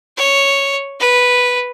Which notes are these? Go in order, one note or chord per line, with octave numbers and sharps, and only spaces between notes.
C#5
B4